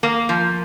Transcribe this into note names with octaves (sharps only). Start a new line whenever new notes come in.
A#3
F3